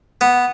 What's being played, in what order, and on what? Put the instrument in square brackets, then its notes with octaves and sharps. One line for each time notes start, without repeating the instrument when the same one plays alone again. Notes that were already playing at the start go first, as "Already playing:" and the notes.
[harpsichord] B3